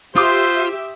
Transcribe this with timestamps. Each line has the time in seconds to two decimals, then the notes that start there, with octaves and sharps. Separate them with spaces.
0.16 F4 G4 C5 E5 C6 D6 D#6